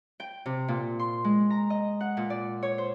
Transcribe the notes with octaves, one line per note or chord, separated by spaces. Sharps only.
G5
C3
A#2
C6
G#3
A#5
D#5
F#5
A#2
D5
C#5
C5